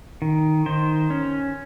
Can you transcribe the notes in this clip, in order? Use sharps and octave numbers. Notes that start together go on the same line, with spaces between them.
D#3
D#3 C5
C#4